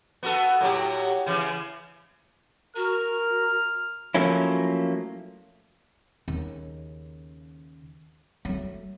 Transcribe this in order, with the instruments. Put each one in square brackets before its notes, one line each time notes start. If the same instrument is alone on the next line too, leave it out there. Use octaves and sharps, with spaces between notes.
[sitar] B3 F#4 A4
A2 F#3 G4
C#3 E3
[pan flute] F#4 [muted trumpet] A#4 [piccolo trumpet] F6
[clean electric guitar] F3 F#3 A3 A#3 C#4 E4
[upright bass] D#2 C#3
F#3 A3